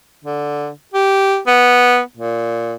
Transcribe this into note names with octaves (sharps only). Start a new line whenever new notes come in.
D3
G4
B3
A#2